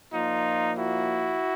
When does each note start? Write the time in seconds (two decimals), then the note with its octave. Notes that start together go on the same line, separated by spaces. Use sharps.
0.13 A#2 F3 A#3 D#4 F4
0.79 E4 F#4